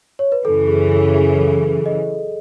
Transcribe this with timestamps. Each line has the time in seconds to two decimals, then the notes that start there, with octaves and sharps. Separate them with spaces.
0.19 C#5
0.32 B4
0.44 F#2 C#3 E3 A4
0.67 G#4
0.92 A4
1.15 G#4
1.38 A4
1.86 D#5